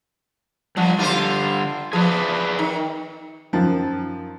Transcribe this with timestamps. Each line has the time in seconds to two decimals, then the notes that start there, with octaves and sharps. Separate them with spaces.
0.77 G2 F3 G3 F#5
0.99 D3 G3 F4 C5
1.93 F3 G#4 B4 D5
2.59 D#3
3.53 F#2 D#3 F3